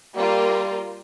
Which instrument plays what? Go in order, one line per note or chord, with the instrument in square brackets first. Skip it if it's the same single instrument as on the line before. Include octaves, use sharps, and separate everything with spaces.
[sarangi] G3 [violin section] A#3 F4 A#4